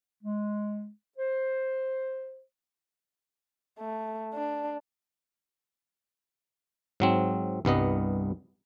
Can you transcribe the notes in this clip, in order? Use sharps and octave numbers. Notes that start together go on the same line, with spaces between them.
G#3
C5
A3
D4
G#2 F#3 C4
C2 G2 B3 D#5